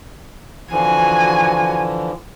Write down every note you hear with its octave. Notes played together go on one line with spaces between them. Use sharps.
D3 E3 F3 F#4 G#5